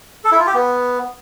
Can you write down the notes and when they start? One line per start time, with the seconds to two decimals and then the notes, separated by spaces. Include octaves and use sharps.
0.24 A4
0.32 E4
0.39 F4
0.47 G4
0.54 B3